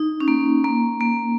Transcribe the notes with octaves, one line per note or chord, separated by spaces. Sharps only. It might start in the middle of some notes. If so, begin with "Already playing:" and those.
Already playing: D#4
C#4
A#3
A#3
A#3